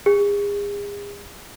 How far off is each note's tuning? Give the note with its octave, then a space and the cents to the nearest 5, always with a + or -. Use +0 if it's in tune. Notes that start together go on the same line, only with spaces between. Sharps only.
G#4 -40